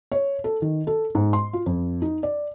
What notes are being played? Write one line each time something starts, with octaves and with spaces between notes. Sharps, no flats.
C#5
A4
D#3
A4
G#2
C6
F4
F2
D#4
D5